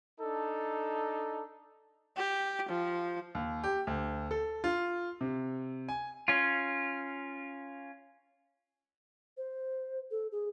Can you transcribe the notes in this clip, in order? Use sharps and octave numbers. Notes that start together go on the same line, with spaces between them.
D4 D#4 A4
G4
F3
D#2
G4
D2
A4
F4
C3
G#5
C#4 F4
C5
A4
G#4